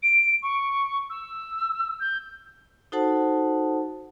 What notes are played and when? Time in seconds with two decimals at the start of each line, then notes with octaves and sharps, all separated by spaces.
0.02 D7
0.42 C#6
1.09 E6
2.00 G6
2.92 D#4 F#4 A4 C5 F#5 A5